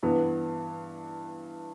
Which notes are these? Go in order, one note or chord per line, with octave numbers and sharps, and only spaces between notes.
G2 E3 B3